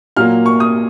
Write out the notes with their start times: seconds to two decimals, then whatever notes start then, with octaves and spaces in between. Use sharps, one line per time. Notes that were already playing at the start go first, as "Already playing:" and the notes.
0.17 A#2 F#3 A#3 F6
0.46 C#6
0.60 D#6